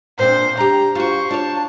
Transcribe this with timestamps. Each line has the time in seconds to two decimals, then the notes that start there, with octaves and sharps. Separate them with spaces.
0.19 A#2 C4 D4 C5
0.57 D4 G4 A#5
0.95 F4 F#4 C5 C#6
1.31 D4 F4 C#5 A5